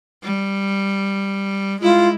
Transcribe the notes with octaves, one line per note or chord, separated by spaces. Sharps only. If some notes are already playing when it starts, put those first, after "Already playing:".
G3
G#3 E4 F4